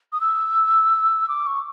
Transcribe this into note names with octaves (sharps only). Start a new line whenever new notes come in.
D#6
E6
D6
C#6